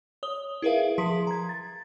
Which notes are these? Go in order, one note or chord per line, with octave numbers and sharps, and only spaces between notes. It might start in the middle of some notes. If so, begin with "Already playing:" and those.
C#5 D#6 G7
E4 G#4 A#4 B4 E5 F5
F3 G#4 C6 B6
A#5 G#6
A6